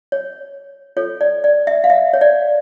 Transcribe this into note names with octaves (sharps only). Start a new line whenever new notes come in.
C#5
F4 A4 C#5
D5
D5
E5
F5
E5
C#5
D5